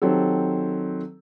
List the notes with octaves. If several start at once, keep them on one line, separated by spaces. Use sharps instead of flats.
D#3 F#3 C4 G4 A4